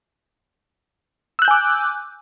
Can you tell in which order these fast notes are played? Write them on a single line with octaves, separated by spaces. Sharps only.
E6 F#6 G6 G#5 D6